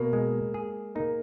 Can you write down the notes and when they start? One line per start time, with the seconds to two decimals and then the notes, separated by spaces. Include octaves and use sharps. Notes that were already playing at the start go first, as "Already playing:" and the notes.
Already playing: B2 A#3
0.13 G#3
0.54 G#4
0.95 A#3 D#4